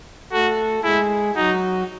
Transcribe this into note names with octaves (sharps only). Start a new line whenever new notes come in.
A3 F#4 A4
G#3 E4 G#4
F#3 D#4 F#4